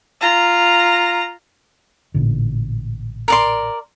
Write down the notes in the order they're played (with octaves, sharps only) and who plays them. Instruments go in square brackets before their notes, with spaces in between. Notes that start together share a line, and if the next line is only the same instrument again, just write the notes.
[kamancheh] F4 A#5
[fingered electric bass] A1 A#2 D3
[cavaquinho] A#4 D5 C6